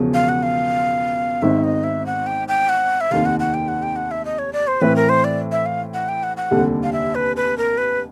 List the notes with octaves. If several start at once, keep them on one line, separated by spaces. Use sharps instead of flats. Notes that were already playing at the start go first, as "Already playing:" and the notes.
Already playing: E1 E2 C#3 F3
F5
F#5
F5
G#1 G#2 D#3 E5
D#5
E5
F#5
G5
G5
F#5
E5
F1 D#2 D#3 F5
F#5
F#5
G5
F#5
G5
F#5
E5
D#5
C#5
D5
C5
A2 E3 A3 C4 B4
A#4
C5
D5
E5
F5
F#5
G5
F#5
F#5
F1 D#2 D3 G3
F5
E5
B4
B4
A#4
B4